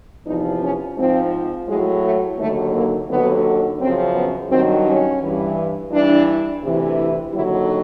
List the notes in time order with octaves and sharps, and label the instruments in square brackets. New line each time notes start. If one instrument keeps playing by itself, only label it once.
[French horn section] E2 C3 F3 D#4
C#4
G#2 F3 C4
A2 F#3 G#3
A3
D#2 D3 F#3 A3
A#3
D#2 D3 F#3 B3
F#2 C#3 F3 C4
B3
G2 D#3 F#3 C4
C#4
G2 E3
G2 E3 D4
D2 C3 E3
E4
D#2 D3 F#3 E4